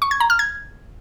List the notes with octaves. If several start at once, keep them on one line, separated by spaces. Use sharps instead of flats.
C#6
G#6
A#5
F6
G#6